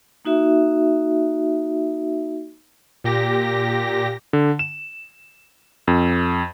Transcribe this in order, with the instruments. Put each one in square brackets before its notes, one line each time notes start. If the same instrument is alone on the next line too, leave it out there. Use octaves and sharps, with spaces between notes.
[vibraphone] A#3 D#4 F#4 E5
[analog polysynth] A#2 G4 A#6
[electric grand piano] D3
E7
F2